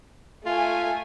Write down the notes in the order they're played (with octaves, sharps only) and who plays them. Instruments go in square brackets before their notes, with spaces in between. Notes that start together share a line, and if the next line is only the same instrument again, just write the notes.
[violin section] A3 G#5 [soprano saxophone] F4